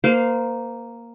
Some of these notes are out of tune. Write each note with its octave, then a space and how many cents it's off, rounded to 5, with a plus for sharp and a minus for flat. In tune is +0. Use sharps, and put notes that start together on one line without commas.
A#3 +0 C5 -25 F5 +0